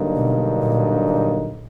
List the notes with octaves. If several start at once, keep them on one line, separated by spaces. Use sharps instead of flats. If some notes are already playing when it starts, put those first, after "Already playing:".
Already playing: G2 D3 F#3 A#3 D#4
B2
A#2
A#2